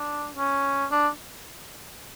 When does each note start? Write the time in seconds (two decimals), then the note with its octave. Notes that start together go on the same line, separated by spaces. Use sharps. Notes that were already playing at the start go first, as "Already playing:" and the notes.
Already playing: D4
0.35 C#4
0.91 D4